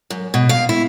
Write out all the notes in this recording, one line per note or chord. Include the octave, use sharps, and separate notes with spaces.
F#2
B2
F5
E4